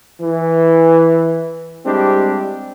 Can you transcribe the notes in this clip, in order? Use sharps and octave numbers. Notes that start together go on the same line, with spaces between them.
E3
G3 G#3 C4 D4 E4 G4